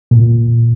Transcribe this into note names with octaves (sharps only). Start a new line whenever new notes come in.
A#2